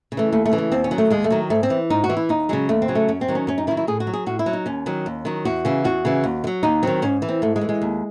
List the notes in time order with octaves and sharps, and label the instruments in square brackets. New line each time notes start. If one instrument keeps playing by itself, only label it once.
[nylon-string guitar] C#3
E3 A3
D#2 A3
A3
C#3 E3
A3
D#2 C4
C#4
D#3 F#3
A3
D#2 G#3
A3
D#3 F#3
G#2 A3
C4
E3
G#2 D#4
F#4
E3
E4
D#2 D#4
C#3 F#3 G#3
D#2 A3
C4
C#3 F#3
A3
F#2 C#4
C4
D#3 F#3
C#4
F#2 C#4
D#4
D#3 E4
F#3
E4
A2 G#4
F#4
F#3
G#4
A2 F#4
E4
F#3
D#4
D#2 C#4
D#3 F#3
D#2
D#3 F#3
E2 F#4
C#3 E3
E2 F#4
C#3 E3
D#2
D#3
F#3
D#2 D#4
D#3 F#3 C4
G#2 C#4
E3
C4
G#2 A3
G#3
E3
G#3
D#2